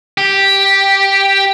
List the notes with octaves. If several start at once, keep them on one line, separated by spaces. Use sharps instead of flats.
G4